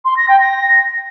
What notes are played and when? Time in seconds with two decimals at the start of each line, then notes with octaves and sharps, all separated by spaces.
0.05 C6
0.17 A#6
0.28 G5
0.40 A#6